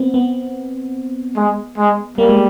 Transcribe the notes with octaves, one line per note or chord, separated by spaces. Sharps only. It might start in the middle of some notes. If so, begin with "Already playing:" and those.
Already playing: B3 C4
B3
G#3
G#3
G3 A#3
G#3